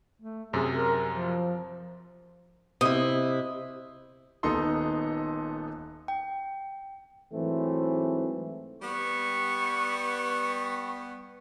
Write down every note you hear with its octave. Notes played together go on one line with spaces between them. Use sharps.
A3
F#2 C3 G#4
A#4
F3
C3 E4 D#5
D#1 B3 D#4 A4 C6
G5
G#2 E3 F#3 A3 C4
G3 B3 C#6